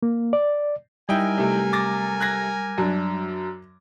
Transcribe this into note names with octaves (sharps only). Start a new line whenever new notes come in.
A#3
D5
G3 D#4 E4 A#4 G5 G#5
C3 A3
D6 A6 A#6
F#6 G#6 A#6
F#2 D4